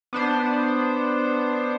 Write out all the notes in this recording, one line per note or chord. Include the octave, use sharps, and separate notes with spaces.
B3 D4 C5